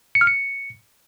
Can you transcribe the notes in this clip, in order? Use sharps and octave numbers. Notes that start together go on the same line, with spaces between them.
C#7
F6
C#7